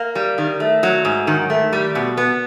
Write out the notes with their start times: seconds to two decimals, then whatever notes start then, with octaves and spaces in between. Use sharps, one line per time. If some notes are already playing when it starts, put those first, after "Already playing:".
Already playing: A#3
0.15 G3
0.38 D#3
0.60 A3
0.83 F#3
1.05 G#2
1.27 D#3
1.50 A3
1.73 G3
1.95 B2
2.17 B3